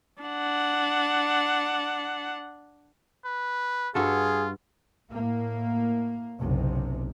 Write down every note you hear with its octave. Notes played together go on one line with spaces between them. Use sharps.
D4 F#5
B4
G2 F4 F#4 G#4 A4
A2 A#3
F#1 B1 C3